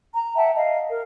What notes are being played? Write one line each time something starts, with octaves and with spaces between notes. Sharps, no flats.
A#5
E5 F#5 G5 A5
D#5 F5
A#4